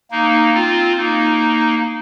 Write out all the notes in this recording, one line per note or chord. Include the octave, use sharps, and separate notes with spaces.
A#3 D#4
C4 F4
A#3 D#4